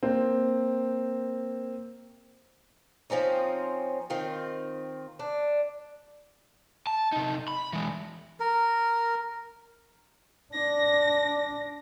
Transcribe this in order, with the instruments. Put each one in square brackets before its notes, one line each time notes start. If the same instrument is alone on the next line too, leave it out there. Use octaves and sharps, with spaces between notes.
[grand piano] A#3 C4
[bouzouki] F3 C4 C#4 D#4
D#3 C4 F4
D4
[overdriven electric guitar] A5
C3 D#4
B5
E3 G#3
[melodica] A#4
[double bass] D4 [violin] A#6